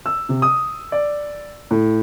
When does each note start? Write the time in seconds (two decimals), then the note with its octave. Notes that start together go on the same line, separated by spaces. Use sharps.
0.06 E6
0.29 C3
0.42 D#6
0.92 D5
1.71 A2